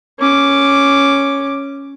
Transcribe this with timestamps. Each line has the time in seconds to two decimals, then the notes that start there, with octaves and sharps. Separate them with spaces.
0.20 C#4 D6